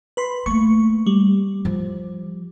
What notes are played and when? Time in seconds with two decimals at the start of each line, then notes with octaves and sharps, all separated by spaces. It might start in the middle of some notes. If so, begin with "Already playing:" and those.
0.17 B4 B5 C6
0.46 A3 A#3 C#6
1.07 G3
1.65 F3